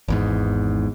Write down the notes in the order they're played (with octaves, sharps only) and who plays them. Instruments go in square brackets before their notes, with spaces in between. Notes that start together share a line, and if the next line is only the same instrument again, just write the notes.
[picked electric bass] G#1 E2 G#2